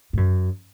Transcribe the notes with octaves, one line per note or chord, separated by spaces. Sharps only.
G#2
F#2